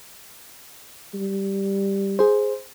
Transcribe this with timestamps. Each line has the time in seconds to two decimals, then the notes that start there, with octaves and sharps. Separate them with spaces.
1.14 G3
2.19 G#4 C5